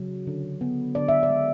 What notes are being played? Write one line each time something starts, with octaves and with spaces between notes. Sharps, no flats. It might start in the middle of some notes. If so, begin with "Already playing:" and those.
Already playing: C#3 F#3
D3
B3
D3 D5
E5
D5
G#3